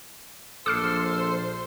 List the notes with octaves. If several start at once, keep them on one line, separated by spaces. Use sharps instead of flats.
A#1 A4 C5 C6 D6 F6 C7